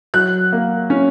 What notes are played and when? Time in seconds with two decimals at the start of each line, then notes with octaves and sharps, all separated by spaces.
0.14 F#3 F#6
0.52 A#3
0.90 C#4